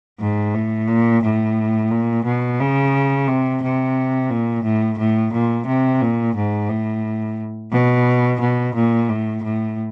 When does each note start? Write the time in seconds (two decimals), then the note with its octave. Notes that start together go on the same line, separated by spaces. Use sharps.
0.20 G#2
0.54 A2
0.88 A#2
1.23 A2
1.91 A#2
2.25 B2
2.60 C#3
3.28 C3
3.63 C3
4.31 A#2
4.64 A2
4.99 A2
5.33 A#2
5.67 C3
6.02 A#2
6.36 G#2
6.70 A2
7.72 B2
8.41 B2
8.75 A#2
9.10 A2
9.44 A2